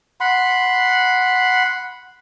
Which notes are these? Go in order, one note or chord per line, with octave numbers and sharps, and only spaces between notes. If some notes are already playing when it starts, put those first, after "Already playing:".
F#5 B5 C6